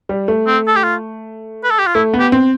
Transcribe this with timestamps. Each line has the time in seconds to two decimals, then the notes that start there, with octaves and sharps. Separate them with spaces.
0.09 G3
0.28 A3
0.47 C4
0.67 A4
0.76 G4
0.84 F4
1.64 B4
1.71 A4
1.79 G4
1.86 F4
1.94 A3 E4
2.14 B3
2.20 G4
2.32 C4